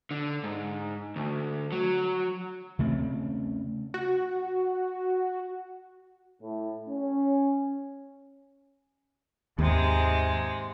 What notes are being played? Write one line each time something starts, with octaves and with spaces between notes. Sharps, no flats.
D3
G#2
D2
F#3
C#3 A3 B3 C4
F#4
A2
C#4
D#2 G#2 C3 G#3